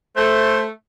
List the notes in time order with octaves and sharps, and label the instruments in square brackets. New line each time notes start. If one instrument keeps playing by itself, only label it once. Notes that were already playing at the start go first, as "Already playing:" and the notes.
[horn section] A3 [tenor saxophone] C5